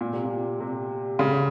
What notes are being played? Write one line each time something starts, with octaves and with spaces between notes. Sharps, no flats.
A#2
C3
A#2
C3
C#3